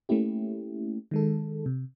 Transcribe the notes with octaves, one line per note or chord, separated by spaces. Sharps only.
A3 A#3 C#4 E4 G4
D#3 G#3 A4
C3